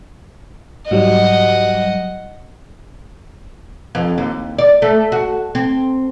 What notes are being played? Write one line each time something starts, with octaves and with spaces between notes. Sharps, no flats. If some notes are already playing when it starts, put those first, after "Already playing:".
G#2 F#3 G3 D#5 F#5
F2
D#2
D5
A3
F#4
C4